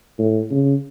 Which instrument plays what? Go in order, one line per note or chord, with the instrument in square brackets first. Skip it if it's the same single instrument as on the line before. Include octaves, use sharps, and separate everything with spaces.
[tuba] A2
C#3